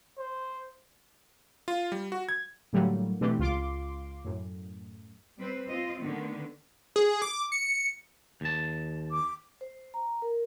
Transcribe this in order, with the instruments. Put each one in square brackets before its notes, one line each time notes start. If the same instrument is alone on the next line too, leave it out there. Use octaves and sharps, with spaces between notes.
[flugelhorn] C5
[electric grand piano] F4
G3
F#4
G#6
[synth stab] A2 D3 F#3 G3 A3 A#3
B2 E3 A3 C4 D4 G4
C#2 F4 C6 D6
F#2 A2
[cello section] G3 C4 B4 C5
C4 F4 D#5
D3 D#3 A3 B3
[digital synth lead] G#4
D6
C#7
[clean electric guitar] D#2 A5
[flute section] D6
[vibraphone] C5
A#5
A#4